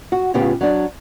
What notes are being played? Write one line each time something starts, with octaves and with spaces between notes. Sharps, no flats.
F#4
A2 C#3 B3 F4 G4
F#3 D4